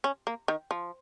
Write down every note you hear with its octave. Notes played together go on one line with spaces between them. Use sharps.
C#4
A#3
D#3
F3